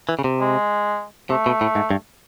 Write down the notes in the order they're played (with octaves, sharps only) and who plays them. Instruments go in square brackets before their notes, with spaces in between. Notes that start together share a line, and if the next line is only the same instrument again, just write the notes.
[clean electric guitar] E3
C#3
C3
[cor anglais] G#3
[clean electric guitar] C3 [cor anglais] A3
[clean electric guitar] B2
A2
G#2
G2